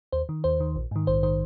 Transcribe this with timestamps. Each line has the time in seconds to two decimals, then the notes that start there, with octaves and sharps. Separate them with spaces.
0.12 D#2 C5
0.29 D#3
0.44 D#2 C5
0.60 D#3
0.76 A#1
0.91 G#2 D#3
1.07 A#1 C5
1.23 D#3 C5